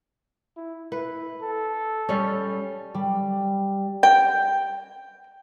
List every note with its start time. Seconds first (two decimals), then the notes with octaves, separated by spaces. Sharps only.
0.57 E4
0.92 E4 B4
1.43 A4
2.09 G3 C#4
2.94 G3
4.03 G5